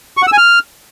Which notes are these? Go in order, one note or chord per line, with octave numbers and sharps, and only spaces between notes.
C#6
F#5
E6
G#5
F6